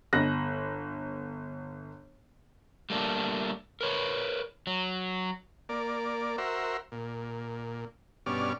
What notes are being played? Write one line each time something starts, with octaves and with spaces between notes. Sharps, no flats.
G1 F#6 A#6
G3 A3 A#3 D4
A#4 B4 C#5
F#3
A#3 D5
F#4 A#4 C5 E5
A#2
G2 B2 C#4 D5 F6